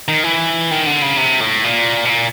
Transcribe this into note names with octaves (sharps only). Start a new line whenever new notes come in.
D#3
E3
D#3
D3
C#3
C3
A2
A#2
B2
A#2